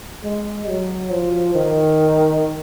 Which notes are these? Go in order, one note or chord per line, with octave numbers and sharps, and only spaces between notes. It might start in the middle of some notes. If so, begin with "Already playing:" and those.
G#3
F#3
F3
D#3